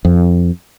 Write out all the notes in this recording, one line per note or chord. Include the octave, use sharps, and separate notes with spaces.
F2